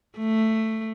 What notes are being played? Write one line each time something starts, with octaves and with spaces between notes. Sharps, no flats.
A3